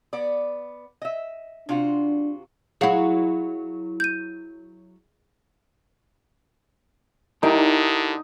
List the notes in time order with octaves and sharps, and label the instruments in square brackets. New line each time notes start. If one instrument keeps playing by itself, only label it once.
[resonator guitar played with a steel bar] B3 D5
D#5 E5
[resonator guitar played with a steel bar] C3 F4 F#4 [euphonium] D4
[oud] F#3 E4 [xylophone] G#4 F5 F#5
[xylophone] G6 D#7
[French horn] D3 [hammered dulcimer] D#4 [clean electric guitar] E4 G4 A#4